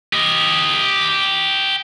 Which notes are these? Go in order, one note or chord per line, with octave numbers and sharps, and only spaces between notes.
G4 D#5